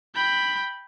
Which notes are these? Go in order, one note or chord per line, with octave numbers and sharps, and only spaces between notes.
G5 B5